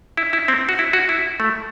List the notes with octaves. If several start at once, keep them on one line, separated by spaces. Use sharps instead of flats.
E4
E4
C4
F#4
E4
F#4
E4
A3